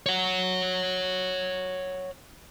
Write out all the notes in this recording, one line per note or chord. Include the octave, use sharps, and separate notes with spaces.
C#5 F#5